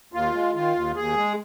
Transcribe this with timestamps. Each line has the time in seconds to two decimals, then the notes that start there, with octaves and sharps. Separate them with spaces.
0.13 D#2 F4
0.33 G#3
0.54 D#3 F4
0.75 D#2
0.96 D#2 G#4
1.17 G#3